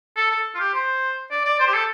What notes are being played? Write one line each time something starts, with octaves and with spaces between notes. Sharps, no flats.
A4
A4
F4
G4
C5
D5
D5
C5
G4
A4